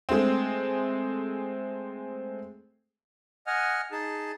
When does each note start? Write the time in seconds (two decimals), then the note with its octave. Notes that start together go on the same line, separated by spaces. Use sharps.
0.09 G#3 A3 C4
3.47 D#5 F#5 G#5 F6
3.92 D#4 G#4 A5